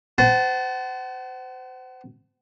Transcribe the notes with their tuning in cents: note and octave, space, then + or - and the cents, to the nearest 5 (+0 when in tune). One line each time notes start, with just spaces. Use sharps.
C5 -30 F#5 +35 A5 -10